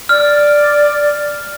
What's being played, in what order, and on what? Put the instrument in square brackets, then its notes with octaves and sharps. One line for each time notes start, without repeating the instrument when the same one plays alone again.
[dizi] D5 [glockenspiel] F6